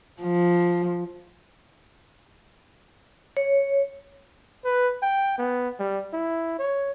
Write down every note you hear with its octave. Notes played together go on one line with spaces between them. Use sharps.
F3
C#5
B4
G5
B3
G3
E4
C#5